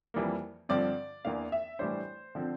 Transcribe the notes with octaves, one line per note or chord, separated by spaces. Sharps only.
F2 E3 G3 A#3
G2 D3 F3 C4 D5
E2 E3 A#3 D4 F5
E5
A2 E3 G3 D4 C5
D3 F3 C4